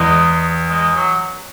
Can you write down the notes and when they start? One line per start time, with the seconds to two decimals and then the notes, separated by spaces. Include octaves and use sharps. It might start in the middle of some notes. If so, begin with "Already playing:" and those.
Already playing: E2 G#3
0.70 G#3
0.94 F#3